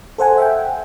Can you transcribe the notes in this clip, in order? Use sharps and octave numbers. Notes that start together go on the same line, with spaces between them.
A4 C5 F#5 G#5
E5 F#5 G5